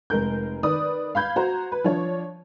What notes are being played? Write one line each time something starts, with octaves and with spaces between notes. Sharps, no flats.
F1 G#3 A#4 G6
D#3 B4 D5 D#6
F5 B5 G6 G#6
F#4 C5 A#5
B4
F3 D4 C#5